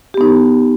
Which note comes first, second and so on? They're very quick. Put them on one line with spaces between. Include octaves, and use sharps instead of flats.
G4 B3 D#4